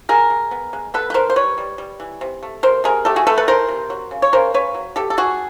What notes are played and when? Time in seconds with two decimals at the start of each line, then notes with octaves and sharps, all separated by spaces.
0.09 G#3 G#4 A#4
0.30 G#3
0.51 B3
0.73 G#3
0.94 B3 A4 B4
1.10 B4
1.14 D#3 A#4 C5
1.30 C5
1.36 G3 B4 C#5
1.58 G3
1.78 G3
2.00 E3
2.21 C3
2.43 A3
2.63 C3 A#4 C5
2.84 C3 G#4 A#4
3.05 A3 G4 A4
3.16 F#4 G#4
3.27 A3 A4 B4
3.38 A4 B4
3.48 E3 A#4 C5
3.69 C3
3.90 F#3
4.11 C#3
4.22 C#5
4.33 C#3 A#4 C5
4.54 C#3 B4 C#5
4.74 F#3
4.96 B2 G4 A4
5.10 A4
5.17 B3 F#4 G#4